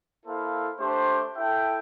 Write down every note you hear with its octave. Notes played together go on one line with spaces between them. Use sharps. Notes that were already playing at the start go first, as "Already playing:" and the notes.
A#3 E4 A4 C5 F5
A3 D4 G4 C5
E4 A4 E5 G5